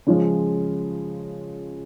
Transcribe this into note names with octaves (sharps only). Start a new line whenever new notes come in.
C#3 F3 G#3 C#4 F4